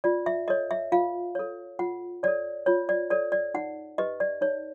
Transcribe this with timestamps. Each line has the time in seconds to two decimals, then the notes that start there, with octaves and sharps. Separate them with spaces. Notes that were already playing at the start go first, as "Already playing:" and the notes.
0.04 F4 D5
0.26 E5
0.48 A4 C#5 D#5
0.71 E5
0.92 F4 F5
1.35 A4 C#5
1.79 F4 F#5
2.23 A4 C#5 D5
2.66 F4 C#5
2.89 D5
3.10 A4 C#5 D5
3.32 D5
3.54 D#4 F#5
3.98 G4 B4 D#5
4.20 D5
4.41 D#4 C#5